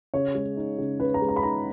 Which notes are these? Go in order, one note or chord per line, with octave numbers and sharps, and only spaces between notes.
C#3 C#5
G#3
D#4
C#3
C#3 B4
A#5
G#3
A#5
B5
D#4 A#5